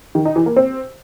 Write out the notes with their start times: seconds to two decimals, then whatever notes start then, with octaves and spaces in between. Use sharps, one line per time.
0.15 D#3
0.25 D#4
0.36 E3
0.46 A#3
0.56 C4